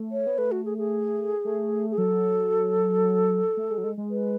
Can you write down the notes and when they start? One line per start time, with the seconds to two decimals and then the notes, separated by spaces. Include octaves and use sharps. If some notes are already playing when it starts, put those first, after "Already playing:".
Already playing: A3
0.12 C#5
0.27 B3
0.38 A3 B4
0.52 F#4
0.65 G#4
0.78 G#4
1.45 A3
1.91 G#4
1.98 F#3 A4
3.57 A3
3.70 G#3
3.78 F#3
3.84 G#3
3.97 G#3
4.10 B4